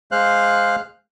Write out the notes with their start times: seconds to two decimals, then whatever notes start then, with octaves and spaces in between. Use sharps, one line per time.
0.11 G#3 C5 F5 F#6